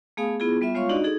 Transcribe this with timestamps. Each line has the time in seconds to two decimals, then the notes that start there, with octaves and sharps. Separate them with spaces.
0.17 A3 B3 G#4 F5 G#5 D#6
0.40 B3 E4 F4 G#4
0.61 G3 B3 F4 E5
0.75 G#3 F4 C#5 F5 C6 C#6
0.89 D4 D#4 F#4 D5 D#5
1.04 D#4 G#4 A4